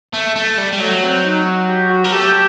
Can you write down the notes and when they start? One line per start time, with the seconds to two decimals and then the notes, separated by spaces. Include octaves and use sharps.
0.14 A3
0.36 A3
0.58 G3
0.73 G3
0.80 F#3 A3
1.02 C4
1.24 D#4
1.46 F#4
1.69 G4
1.90 F#4
2.04 A#3
2.12 A3 G4